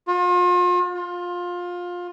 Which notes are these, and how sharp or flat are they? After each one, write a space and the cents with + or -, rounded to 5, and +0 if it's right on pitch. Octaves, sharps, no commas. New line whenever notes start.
F4 +40
F4 +20